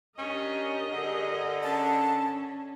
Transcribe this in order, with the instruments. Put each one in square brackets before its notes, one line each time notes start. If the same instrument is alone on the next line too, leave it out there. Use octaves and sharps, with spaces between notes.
[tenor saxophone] C#4 [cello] D4 G4 [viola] A#4 D#5
[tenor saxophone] D3 [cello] G4 G#4
[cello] C#4 [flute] A5